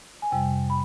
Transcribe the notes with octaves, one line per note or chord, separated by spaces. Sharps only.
G#5
F2 C3 G3 G5
B5